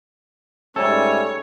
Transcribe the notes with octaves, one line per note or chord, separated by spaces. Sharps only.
G#2 G3 A3 C#4 A4 C#5